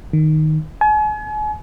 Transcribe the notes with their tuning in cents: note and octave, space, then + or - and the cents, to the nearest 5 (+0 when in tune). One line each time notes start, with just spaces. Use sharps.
D#3 -5
G#5 +40